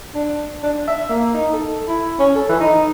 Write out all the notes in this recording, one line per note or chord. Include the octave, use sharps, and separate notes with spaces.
D4
D4
E5
A#3
D#4
A4
E4
C#4
A4
E3
D#4